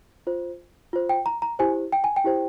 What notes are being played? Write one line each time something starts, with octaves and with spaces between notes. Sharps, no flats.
F4 C5
F4 C5
G5
A#5
A#5
E4 G4 C5 G#5
G5
G#5
G5
E4 G4 C5